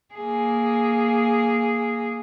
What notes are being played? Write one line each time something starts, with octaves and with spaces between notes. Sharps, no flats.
A#3 G#4